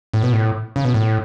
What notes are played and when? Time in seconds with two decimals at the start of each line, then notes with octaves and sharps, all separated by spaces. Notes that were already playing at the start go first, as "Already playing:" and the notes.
0.14 A2
0.23 B2
0.33 A2
0.76 C#3
0.84 B2
0.94 A2